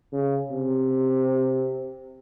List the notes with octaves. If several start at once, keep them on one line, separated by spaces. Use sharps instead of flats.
C#3
C3